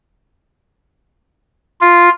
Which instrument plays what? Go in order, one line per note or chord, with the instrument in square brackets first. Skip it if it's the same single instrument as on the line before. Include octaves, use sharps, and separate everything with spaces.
[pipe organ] F4